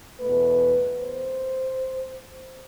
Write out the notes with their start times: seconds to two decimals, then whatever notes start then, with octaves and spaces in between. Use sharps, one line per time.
0.20 E2 B2 A3 B4
1.00 C5